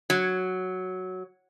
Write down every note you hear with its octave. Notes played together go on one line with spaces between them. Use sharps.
F#3